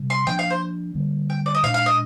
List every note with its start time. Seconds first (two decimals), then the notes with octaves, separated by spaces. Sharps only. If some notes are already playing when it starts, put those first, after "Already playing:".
Already playing: C3 G3
0.10 C6
0.27 F3 A#3 D4 G5
0.39 F5
0.50 C5
0.95 D3 G3 A#3
1.30 G5
1.46 D5
1.55 D#5
1.63 A#2 G#3 D4 F5
1.74 F5
1.86 D#5